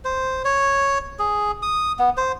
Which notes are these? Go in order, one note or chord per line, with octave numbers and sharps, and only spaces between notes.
C5
C#5
G#4
D#6
B3
C5